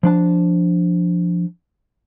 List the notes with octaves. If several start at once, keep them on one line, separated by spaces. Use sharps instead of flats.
F3 D4 A5